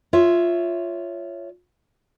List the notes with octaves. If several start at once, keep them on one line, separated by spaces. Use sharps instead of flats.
F4 C#5 E5